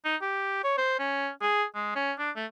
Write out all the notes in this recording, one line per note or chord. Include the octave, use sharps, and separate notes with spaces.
D#4
G4
C#5
C5
C#4
G#4
G#3
C#4
D4
A3